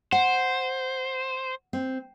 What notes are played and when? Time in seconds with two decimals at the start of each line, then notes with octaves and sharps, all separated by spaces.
0.12 C5 F#5
1.73 C4